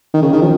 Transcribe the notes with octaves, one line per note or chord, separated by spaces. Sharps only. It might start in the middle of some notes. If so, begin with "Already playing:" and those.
D#3
C#3
D#3
F3